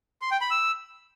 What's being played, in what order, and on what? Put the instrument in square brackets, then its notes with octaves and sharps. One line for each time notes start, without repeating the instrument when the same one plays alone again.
[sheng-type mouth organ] C6
G5
B5
E6